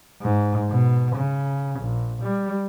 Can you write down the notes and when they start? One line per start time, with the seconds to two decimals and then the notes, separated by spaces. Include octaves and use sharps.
0.22 G#2
0.70 B2
1.15 C#3
1.80 A#1
2.23 G3